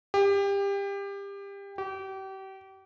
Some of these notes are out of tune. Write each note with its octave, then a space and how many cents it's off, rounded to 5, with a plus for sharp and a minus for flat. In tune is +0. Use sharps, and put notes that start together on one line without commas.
G4 +25
G4 -35